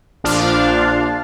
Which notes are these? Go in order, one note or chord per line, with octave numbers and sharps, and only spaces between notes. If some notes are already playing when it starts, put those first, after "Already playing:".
A#1 F3 D4 F5